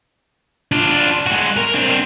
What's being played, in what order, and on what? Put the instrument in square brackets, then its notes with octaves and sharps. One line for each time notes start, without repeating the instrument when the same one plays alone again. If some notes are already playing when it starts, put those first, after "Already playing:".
[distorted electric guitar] D4 F4
G#3 F#4
A#4
C4 D4